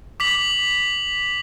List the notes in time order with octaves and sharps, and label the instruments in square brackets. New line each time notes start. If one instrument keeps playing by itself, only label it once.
[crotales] D6 B6 F#7